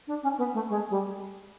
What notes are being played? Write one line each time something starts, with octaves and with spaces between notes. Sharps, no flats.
D4
C#4
B3
A3
G#3
G3